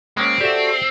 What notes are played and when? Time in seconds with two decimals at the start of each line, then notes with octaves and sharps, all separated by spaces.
0.17 G#3 A#3 C4 C#4
0.41 F#4 G4 A4 D5 E5